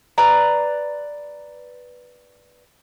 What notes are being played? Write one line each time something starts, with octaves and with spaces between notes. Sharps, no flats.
B4 D5 A#5